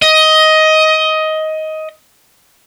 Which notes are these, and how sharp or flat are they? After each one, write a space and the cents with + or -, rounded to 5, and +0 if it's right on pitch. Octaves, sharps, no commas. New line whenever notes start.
D#5 +15